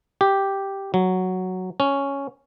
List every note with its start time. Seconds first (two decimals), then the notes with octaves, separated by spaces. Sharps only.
0.21 G4
0.94 F#3
1.80 C#4